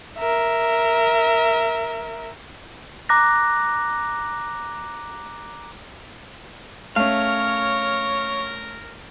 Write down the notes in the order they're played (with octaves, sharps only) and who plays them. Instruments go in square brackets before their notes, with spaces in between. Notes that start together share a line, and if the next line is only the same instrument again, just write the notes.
[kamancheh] A#4 E5
[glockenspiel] A#5 D6 F#6 A#6
[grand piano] A3 C#4 [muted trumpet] A#4 [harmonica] C#5 [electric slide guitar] F5